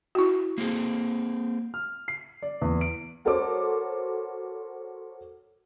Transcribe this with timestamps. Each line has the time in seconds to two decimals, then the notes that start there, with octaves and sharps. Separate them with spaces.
0.15 E4 F#4
0.58 A#3 C4 G#4
1.74 F6
2.08 C7
2.42 D5
2.62 E2
2.81 D7
3.25 F#4 A4 A#4 C5 C#5 D6